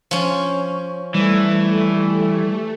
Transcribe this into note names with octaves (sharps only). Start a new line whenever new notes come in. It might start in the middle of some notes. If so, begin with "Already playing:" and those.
F3 C#4
E3 G3 A3